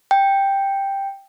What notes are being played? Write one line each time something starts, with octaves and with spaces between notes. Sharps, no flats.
G5